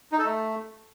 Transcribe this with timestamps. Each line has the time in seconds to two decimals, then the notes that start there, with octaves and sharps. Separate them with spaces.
0.12 D#4
0.19 A4
0.25 A3